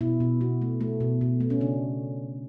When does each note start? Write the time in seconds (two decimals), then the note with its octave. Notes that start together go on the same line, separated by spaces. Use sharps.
0.01 B2 E4
0.20 B2
0.41 B2 F#4
0.62 A3
0.81 A3
1.00 B2
1.21 B2
1.40 A3
1.50 C#4
1.61 C#3 D4